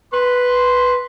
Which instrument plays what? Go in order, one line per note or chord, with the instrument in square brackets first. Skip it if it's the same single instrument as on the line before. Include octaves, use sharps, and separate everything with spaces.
[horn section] B4 C6